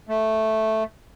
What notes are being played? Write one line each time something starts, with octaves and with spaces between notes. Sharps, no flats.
A3